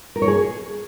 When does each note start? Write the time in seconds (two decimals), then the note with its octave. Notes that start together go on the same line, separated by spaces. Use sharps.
0.16 A#4
0.22 C#5
0.28 G#4